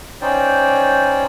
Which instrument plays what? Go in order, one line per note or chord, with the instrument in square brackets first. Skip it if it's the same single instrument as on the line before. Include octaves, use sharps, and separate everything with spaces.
[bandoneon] C#4 D#4 C5 D5 G5